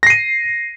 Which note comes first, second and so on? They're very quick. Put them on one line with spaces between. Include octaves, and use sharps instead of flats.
A#6 C7 D#7